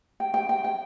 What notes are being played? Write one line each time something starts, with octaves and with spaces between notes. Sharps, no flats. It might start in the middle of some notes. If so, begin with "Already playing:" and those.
G5
G5
G5
G5